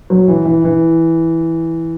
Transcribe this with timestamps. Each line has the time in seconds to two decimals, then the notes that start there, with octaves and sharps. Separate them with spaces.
0.10 F#3
0.28 E3
0.45 E3
0.64 E3